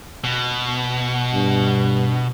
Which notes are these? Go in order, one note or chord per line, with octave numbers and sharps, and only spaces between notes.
B2
G2